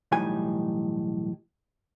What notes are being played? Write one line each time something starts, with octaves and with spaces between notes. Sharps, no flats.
B1 E2 A2 G3 D#4 G#5